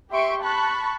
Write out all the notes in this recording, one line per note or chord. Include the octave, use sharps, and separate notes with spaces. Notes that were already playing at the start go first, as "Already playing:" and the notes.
G4 E5 C6 C#6 D7
A5 B5 C#6 F#6